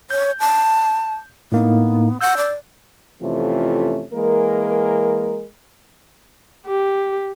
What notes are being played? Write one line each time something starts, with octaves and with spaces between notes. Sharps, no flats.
C#5 G6
A5
A2 A#3 B3 D#4
F#5 E6 G6
D5
F2 C3 E3 A3 C#4 F4
E3 G#3 A#3 A#4
G4